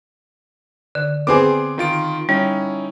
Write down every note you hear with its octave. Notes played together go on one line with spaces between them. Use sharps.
D3
B3 C4 G#4 D6
D#3 F4 D7
G3 C#4 D#4 E4